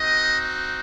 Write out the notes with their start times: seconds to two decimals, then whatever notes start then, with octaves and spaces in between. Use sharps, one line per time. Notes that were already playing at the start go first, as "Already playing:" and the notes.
Already playing: C4 D#4 F#4 D#5